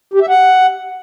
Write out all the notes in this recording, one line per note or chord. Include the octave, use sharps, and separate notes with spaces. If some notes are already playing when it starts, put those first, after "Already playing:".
G4
E5
F#5